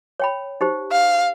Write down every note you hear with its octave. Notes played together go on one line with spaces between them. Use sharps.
C#5 G5 B5
D#4 G4 C5
F5